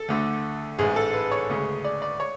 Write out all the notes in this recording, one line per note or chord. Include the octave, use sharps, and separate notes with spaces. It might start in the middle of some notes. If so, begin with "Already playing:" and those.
Already playing: A4
D2 D3 A3
A1 G#2 G#3 G#4
A4
B4
C#5
D2 C#3 G#3
D5
D5
C#5